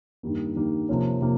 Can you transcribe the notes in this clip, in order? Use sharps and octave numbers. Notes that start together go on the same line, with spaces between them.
G2 D#3 G3 A#3
G2 D#3 G3 A#3
C3 F3 A#3 C#4
C3 F3 A#3